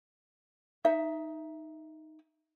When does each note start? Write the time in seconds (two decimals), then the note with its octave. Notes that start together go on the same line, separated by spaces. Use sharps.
0.85 D#4 E5